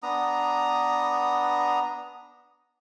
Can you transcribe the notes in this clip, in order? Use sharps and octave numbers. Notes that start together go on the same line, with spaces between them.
B3 D4 A#5 D#6